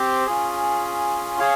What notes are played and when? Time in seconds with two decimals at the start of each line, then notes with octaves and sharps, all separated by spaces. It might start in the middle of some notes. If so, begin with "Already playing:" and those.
Already playing: C4 G4 C5
0.27 C#4 F4 G#4
1.39 G#4 C#5 F5